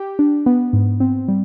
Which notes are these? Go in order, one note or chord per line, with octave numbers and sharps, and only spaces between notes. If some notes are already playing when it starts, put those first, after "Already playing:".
Already playing: G4
D4
B3
G#2
C4
G3